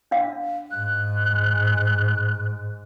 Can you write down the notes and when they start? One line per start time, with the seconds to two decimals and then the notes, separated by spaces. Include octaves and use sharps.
0.11 D4 F5
0.71 G#2 F#6